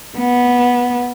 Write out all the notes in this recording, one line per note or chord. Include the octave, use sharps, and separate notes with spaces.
B3